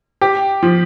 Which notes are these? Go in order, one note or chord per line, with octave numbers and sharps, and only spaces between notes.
G4
F3